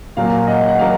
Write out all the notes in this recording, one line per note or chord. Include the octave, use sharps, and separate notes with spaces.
A#2 F#3 A#3 F5
D#5 F#5
F#5
A#2 F#3 A#3 F5